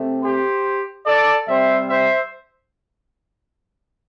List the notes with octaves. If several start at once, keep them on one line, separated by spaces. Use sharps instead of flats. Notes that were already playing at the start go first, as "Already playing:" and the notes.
Already playing: C3 A3 C4
G4 C5
A4 D5
C3 G3 C4 C5 E5
C5 E5